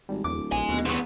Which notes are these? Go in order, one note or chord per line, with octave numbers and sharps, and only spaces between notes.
G#1 G3
D1 E2 D6
A#1 D#5 G#5
D#2 B2
E2 B3 C4 C#6